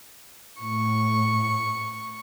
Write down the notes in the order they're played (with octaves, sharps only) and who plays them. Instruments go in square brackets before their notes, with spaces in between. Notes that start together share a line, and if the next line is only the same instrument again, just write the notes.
[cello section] A2 [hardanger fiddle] C#6